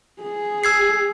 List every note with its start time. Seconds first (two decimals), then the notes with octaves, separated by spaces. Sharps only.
0.22 G#4
0.64 E6 G#6 C7